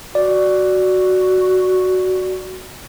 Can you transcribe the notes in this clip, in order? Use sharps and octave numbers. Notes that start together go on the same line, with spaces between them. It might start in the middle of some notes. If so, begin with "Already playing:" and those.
F#4 D5